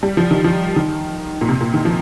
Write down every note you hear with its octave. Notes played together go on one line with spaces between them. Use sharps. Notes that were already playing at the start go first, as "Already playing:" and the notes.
G3
F3
D#3
F3
D#3
A#2
C3
A#2
D#3
F3